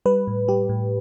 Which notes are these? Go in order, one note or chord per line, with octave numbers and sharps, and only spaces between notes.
G3 B4
A2
G3 G4
A2